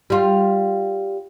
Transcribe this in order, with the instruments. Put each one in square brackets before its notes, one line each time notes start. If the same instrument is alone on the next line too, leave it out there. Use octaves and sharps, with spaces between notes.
[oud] G3 F4